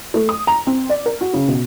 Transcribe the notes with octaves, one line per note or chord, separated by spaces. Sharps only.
A3
D#6
A#5
C4
D5
A#4
F#4
C#3
B2